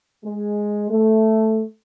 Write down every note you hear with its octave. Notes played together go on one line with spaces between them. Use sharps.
G#3
A3